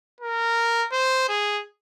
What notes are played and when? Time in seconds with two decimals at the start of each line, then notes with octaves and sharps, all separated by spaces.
0.21 A#4
0.92 C5
1.29 G#4